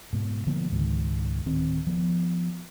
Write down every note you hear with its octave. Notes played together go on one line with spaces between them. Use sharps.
G#2 B2
D3 F3 A#3 B3
C#2 G#2 D#3 G#3
D1 D#3 C4
F3 B3